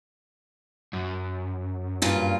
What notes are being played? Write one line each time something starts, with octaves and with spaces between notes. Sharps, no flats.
F#2
G2 A#2 F4